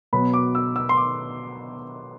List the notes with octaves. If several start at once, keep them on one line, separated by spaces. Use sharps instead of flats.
B2 F#3 B3 B5
D6
E6
E6
C6
D6